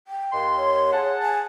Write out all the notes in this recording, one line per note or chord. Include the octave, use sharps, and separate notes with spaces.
G5
D#2 C6
C#5
G#4 F#5 A5
G#5